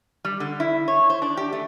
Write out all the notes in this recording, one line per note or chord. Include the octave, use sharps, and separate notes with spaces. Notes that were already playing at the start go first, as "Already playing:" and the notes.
G3
D3
E4
C#5
C5
D4
G4
A3